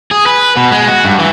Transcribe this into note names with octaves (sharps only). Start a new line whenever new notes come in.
G#4
B4
B2
G#3
F#4
G2
E3